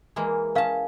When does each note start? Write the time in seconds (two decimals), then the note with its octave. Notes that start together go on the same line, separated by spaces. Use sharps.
0.16 E3 G#3 A#3
0.55 C#4 A#4 F5 A5